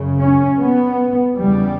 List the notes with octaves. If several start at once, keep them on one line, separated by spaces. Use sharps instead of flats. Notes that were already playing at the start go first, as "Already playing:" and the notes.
Already playing: F#2 C#3
C#4
B3
E2 C#3 G3